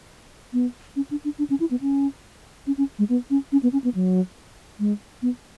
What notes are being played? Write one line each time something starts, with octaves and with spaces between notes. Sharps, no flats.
B3
C#4
D4
D4
D4
C#4
E4
B3
C#4
C#4
C#4
G#3
B3
C#4
C#4
B3
C#4
B3
F#3
G#3
B3